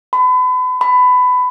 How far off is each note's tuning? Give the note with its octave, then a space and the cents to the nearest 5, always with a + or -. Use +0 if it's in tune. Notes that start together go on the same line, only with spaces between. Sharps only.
B5 +35
B5 +20